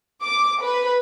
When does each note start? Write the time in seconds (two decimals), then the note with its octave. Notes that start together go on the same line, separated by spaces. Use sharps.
0.23 D6
0.61 B4